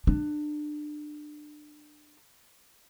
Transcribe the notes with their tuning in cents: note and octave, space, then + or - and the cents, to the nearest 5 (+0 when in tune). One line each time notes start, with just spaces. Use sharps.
D4 +25